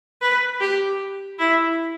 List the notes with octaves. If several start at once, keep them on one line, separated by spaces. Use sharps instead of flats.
B4
G4
E4